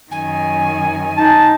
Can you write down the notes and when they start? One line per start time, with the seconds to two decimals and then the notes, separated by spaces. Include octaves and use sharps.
0.11 F#2 D#3 G#5
1.17 D#4 A5